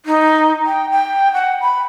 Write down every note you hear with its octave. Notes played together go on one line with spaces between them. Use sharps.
D#4
G5
G5
F#5
B5